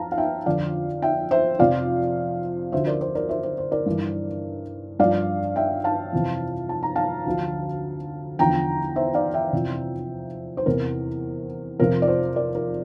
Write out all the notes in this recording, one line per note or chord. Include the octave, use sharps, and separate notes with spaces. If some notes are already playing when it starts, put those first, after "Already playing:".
Already playing: F2 F5 A5 A#5
F5
E5 G5
F2 D3 F3 D5 F5
E5 G5
C5 E5
F2 C3 F3 D5 F5
D2 D3 F3 C5 E5
A#4 D5
C5
A#4 D5
C5 E5
C5
C5
A#4 D5
G2 E3
G2 F3 D5 F5
E5 G5
F5 A5
F2 C3 E3
A5
A#5
F5 A5
D2 D3 F3
E2 D3 F3 G5 A#5
C5 E5
D5 F5
E5 G5
F2 C3 E3
C5
E2 C3 E3 A#4
F2 C3 F3 A#4
D5
C5
A#4 D5
A#4